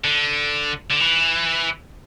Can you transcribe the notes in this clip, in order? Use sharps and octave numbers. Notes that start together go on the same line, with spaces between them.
D3
D3
E3